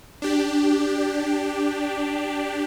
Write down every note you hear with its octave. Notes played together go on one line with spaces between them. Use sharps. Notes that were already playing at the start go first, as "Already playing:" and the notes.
D4 G4